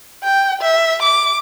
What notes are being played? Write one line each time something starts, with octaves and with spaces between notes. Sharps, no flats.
G5
E5
D6